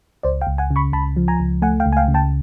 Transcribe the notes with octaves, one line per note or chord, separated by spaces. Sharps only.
C#2 C5 D5
F5 G5
C#2
F#5 G#5
C#3
B5 C#6
C#2 A5 B5
F3
G#5 A#5
C#2
A3 F#5 G#5
F5 G5
C#2
G#5
F5 G5
C#3
G5 A5